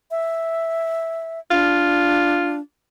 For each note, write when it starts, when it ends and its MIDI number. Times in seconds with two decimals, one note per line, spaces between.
0.11 1.39 76
1.51 2.60 62
1.51 2.55 65